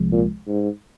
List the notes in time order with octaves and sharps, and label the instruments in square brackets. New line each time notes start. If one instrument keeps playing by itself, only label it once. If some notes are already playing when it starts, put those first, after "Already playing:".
Already playing: [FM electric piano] C2 C3 F3 G#3
[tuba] A#2
G#2